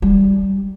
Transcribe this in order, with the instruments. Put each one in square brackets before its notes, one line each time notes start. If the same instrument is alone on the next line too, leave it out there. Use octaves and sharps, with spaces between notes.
[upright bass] G3